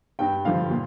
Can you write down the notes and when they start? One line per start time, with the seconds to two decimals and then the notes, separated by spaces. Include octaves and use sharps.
0.19 G2 G5
0.45 D3 F3 F5
0.71 A#2